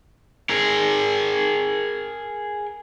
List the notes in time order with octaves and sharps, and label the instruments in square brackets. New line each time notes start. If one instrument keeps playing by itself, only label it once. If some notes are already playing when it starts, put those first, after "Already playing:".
[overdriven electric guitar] G#4 A#4